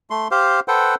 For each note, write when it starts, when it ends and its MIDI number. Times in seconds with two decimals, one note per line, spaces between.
0.10 0.28 57
0.10 0.28 84
0.31 0.60 67
0.31 0.60 72
0.31 0.60 77
0.68 0.95 69
0.68 0.95 71
0.68 0.95 72
0.68 0.95 78
0.68 0.95 79